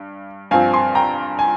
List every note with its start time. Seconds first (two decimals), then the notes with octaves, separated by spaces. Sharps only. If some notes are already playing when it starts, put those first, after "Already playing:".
Already playing: G2
0.51 G2 F3 C4 F5 G#5
0.73 G#5 C6
0.95 G5 A#5
1.39 G#5